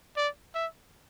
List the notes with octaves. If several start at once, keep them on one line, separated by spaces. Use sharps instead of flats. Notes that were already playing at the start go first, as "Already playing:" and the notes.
D5
E5